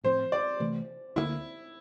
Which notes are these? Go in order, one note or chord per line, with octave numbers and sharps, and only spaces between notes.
A2 F3 C4 C5
D5
C3 E3 A3
D2 D3 F3 A#3 E4